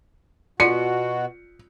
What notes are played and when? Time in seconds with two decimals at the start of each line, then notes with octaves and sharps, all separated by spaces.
0.60 B2 F4 F#4 D5 C6 C#7